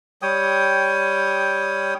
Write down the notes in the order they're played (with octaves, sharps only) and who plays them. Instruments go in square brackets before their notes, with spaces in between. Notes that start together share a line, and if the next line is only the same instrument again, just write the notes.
[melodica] G3 C#5 G5 D#6